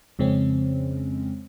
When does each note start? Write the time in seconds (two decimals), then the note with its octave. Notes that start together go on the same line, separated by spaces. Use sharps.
0.19 F2 C#3 G#3 C4 C#4